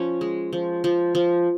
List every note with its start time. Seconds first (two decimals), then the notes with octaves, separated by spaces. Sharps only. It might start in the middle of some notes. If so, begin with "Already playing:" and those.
Already playing: F3 C#4
0.21 G#3
0.53 F3
0.84 F3
1.15 F3